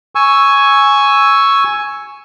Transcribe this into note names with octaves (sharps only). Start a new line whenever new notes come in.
G#5 C#6 E6